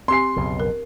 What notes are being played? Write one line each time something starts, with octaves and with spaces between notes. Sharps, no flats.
C4 G4 G#5 C6 C7
B1 F2 C#3
A#4